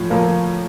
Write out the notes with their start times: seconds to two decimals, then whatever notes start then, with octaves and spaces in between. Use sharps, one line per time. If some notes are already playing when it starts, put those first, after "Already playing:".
Already playing: A2 F3
0.10 A2 F3 A#3